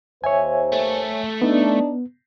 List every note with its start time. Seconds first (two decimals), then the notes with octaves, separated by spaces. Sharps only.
0.24 D#2 C5 C#5 E5 G#5
0.72 A3
1.42 B3 D4 D#4